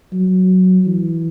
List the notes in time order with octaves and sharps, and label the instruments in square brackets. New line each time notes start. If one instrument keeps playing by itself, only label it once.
[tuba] F#3
E3